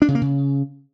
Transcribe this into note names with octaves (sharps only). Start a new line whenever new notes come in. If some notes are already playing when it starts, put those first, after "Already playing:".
D4
C#3
A#3
C#3